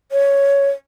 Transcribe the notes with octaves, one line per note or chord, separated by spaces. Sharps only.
C#5